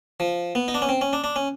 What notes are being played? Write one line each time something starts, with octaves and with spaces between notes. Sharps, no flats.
F3
B3
D#4
D4
C#4
C4
C#4
D4
D4
C#4